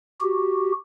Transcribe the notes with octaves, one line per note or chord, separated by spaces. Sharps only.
F#4 G4